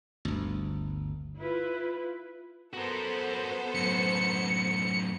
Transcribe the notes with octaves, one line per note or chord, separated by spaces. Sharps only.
G1 D2
E4 F4 B4
B3 F#4 A4 A#4 C5
F#2 A2 C#7